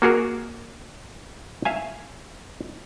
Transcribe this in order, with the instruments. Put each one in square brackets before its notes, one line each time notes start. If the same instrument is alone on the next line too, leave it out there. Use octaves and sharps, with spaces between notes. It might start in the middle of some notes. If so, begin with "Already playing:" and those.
[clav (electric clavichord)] A#3 F#4 G#4 A#4
E5 F5 G#5